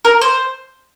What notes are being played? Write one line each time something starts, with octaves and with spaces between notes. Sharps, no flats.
A#4
C5